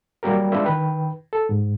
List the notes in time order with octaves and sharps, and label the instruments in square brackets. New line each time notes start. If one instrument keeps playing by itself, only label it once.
[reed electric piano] F#3 G3 A#3 G4 A#4
G#3 D4 F4 B4 D5 E5
D#3 B4 G5
A4
G#2